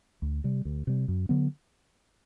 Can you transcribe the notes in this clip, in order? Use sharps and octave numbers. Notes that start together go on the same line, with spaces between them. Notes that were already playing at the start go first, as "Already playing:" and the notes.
D2
C3 G3
D2
C3 G3
F#2
D3 F#3 B3